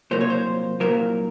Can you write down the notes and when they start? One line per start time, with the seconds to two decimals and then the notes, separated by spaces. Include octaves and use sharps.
0.11 C2 A#2 F#3 A#3 C5
0.21 C#5
0.30 C5
0.80 C2 A#2 F#3 A#3 A#4